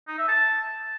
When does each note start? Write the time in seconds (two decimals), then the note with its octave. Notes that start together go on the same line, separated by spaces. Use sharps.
0.08 D#4
0.18 E5
0.28 A5